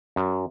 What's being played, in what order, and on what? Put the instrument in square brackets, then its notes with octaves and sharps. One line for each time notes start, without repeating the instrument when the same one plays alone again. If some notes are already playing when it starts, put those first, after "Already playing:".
[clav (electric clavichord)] F#2